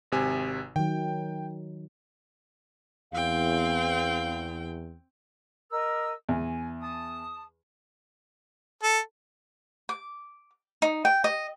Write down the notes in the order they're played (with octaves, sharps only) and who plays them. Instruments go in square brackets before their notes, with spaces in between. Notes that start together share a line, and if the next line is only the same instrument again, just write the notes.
[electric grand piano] G#1 C3 G#5
[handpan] D#3 F#3 [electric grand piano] G5
[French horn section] E2 [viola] C4 G5 [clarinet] F5
[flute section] A#4 D#5 E6
[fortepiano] E2 [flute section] G#5
[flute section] A5 D#6
[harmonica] A4
[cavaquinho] D6
D#4
G5
D#5